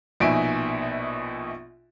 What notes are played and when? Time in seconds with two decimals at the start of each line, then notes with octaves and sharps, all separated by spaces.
0.20 A#1 B2 D#4 E5 G#5 D7